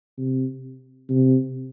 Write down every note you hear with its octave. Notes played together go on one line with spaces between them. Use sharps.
C3
C3